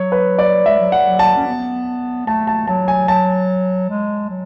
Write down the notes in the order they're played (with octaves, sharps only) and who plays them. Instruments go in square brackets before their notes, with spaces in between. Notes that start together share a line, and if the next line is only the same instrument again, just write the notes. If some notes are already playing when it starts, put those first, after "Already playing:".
Already playing: [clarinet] F#3 [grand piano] C#5
[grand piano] B4
D5
[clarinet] G#3 [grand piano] E5
[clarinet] F#3
[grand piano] F#5
[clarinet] F#3
[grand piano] A5
[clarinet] C#4
B3
[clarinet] A3 [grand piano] A5
[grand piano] A5
[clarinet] F#3 [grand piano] A5
[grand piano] G#5
[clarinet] F#3 [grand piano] A5
[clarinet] G#3
F#3